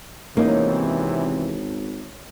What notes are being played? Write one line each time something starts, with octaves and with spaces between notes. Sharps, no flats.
G#1 E2 C3 E3 A#3 C#4 D#4 C#5